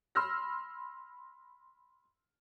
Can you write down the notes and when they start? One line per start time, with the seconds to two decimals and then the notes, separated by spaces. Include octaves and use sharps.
0.15 B5 C6 E6 F6 A#6